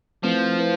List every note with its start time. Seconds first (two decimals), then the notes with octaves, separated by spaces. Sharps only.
0.23 F3 A3 C4 E4 B4
0.57 A3 E4 B4